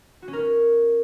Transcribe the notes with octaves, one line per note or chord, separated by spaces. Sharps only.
F#4
C#4
A#4
C#4